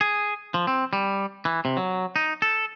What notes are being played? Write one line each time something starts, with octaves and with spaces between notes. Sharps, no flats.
G#4
F3
C4
G3
E3
C3
F#3
D#4
A4